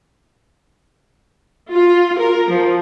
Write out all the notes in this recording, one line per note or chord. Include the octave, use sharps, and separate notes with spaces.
F4
A#4
F3